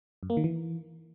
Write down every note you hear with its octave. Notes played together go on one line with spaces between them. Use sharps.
F#2
A#3
D#3
E3